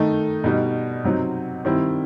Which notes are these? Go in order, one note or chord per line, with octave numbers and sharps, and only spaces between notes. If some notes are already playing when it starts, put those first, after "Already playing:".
Already playing: D#3 A3 D#4
B2 G3 D#4
C3 F#3 C4 D#4
D#3 G3 C4 E4